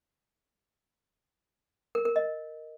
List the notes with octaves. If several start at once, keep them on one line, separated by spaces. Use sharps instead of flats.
A#4
A#4
D#5